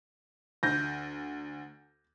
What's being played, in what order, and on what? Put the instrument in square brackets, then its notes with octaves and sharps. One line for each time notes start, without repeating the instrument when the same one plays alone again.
[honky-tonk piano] D2 [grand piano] G6 A#6